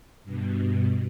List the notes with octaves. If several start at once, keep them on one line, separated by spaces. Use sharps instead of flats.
G2 B2